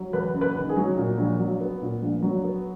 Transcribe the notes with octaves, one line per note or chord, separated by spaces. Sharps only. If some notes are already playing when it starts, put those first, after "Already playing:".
Already playing: F#3
E2 B4
F#1
B4
D#3
G#4
F#3
A#2
A#1
F#3
B3
A#2
A#1
F#3
B3